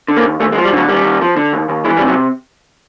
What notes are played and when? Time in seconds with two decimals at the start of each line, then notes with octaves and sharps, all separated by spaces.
0.08 D3
0.17 A#3
0.24 D#2
0.40 D#2 A3
0.52 G#3
0.57 F3
0.65 G3
0.73 D3 F#3
0.88 D#2 G3
1.04 D#2
1.21 F3
1.37 D3
1.53 D#2
1.69 D#2
1.85 E3 G#3
1.97 G3
2.01 C3
2.08 F#3